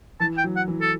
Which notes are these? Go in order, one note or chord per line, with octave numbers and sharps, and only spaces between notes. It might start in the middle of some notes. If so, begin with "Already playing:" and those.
E3 A5
G5
F#3
F#5
E3
A4